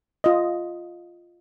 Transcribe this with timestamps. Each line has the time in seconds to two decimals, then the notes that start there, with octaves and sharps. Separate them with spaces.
0.24 F4 D#5